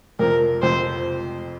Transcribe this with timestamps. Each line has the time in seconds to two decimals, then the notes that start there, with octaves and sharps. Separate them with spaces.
0.19 F2 C3 F3 C4 A#4
0.62 F2 C3 F3 C4 C5